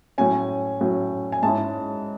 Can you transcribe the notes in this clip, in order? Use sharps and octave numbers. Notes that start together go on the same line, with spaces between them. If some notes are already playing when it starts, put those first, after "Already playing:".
A2 F#3 C#4 G#5
A2 F#3 C#4
G#5
G#2 G#3 C#4 E4 A5